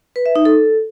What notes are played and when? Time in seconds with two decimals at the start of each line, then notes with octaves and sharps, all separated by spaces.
0.16 B4
0.26 E5
0.36 D#4
0.45 A4